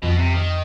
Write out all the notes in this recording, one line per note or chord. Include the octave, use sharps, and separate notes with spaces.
F2 B2
C3
D#3